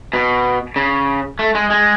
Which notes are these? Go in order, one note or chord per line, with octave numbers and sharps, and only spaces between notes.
B2
C#3
A3
G#3
G#3